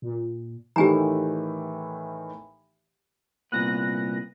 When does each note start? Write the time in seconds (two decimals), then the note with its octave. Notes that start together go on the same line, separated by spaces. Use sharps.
0.02 A#2
0.76 A2 D#3 E3 G4 G#5 A#5
3.52 C2 A#2 B3 F#6 A#6